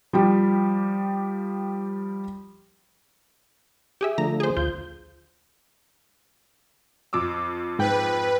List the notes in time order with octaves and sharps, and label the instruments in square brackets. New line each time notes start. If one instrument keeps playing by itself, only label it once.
[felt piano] F3 G3 G4
[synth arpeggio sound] G4 G#4 E5
[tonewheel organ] D3 F3 A3 [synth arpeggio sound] A#5
[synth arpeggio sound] G#4 C5
[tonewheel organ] D2 G6 [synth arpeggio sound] F4
[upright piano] F2 D6 E6
[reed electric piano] G#2 G5 [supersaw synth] B4